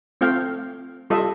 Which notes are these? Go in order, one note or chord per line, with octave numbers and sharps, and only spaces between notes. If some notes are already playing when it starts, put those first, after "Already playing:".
A3 C4 F4 F5 G5
G3 F4 A4 D#5 E5